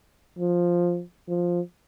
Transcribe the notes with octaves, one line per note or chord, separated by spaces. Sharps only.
F3
F3